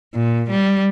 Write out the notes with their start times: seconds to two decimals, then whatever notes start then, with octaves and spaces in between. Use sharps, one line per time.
0.15 A#2
0.50 G3